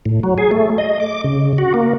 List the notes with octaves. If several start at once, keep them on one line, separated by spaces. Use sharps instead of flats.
A2
F#3
G#4
A3
D#5
D6
C#3
F#4
A#3